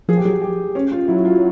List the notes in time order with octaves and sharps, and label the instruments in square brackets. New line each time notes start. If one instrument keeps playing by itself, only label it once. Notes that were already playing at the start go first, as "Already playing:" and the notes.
[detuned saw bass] F3 [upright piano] G#4
[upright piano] G4
[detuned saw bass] F#3 [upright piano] G#4
[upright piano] G4
C#4
F4
[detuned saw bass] F#3 [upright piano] E4
[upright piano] F4